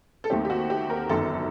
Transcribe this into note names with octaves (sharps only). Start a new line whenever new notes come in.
A4
D#2 D#3 A3 C4 G4
G4
F#4
G4
A#4
G1 F#2 D#3 A4